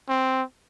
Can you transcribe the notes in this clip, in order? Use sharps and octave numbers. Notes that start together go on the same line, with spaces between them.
C4